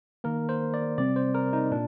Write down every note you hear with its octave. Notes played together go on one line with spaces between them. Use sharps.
D#3 A#3 A#4
C5
D5
C3 G3 C4 D5
C5
A#4
D#4
A#2 D4